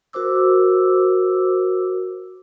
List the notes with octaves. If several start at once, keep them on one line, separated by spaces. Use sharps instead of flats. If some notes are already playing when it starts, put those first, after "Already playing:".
F#4 A#4 C5 D6 E6